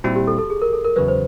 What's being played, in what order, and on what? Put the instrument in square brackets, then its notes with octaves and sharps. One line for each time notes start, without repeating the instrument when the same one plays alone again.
[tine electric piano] A#2 G3 C4 E4 [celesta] F#4
[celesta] G4
A4
A4
G#4
A#4
A4
A#4
[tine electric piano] E2 C#3 F#3 [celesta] B4
[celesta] C5